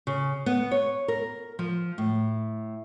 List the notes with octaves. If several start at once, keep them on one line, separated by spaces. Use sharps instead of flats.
C#3
B3
C#5
A#4
F3
A2